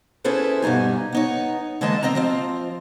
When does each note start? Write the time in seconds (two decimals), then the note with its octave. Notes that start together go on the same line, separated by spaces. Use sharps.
0.24 C#4 E4 G#4 A4 B4 C5
0.62 G2 B2 G3 D#4 G#5
1.12 B3 D#4 C#5
1.81 D3 E3 G#3 A#3 D#5 A5
2.03 C4 D#5 G5 A#5
2.15 F3 C4 F4